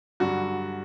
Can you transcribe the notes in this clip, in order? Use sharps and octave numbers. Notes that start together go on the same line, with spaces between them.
G2 D3 F#3 F#4